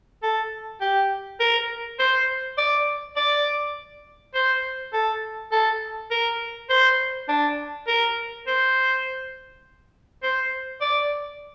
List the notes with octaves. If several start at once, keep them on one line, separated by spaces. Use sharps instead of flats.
A4
G4
A#4
C5
D5
D5
C5
A4
A4
A#4
C5
D4
A#4
C5
C5
D5